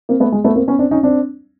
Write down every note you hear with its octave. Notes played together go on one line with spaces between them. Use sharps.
A#3 C4
A3 B3
G#3
A3 B3
A#3 C4
B3 C#4
C4 D4
C#4 D#4
C4 D4